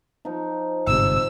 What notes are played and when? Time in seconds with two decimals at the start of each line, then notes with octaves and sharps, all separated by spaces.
0.25 F3 D#4
0.87 G1 G#2 C3 E6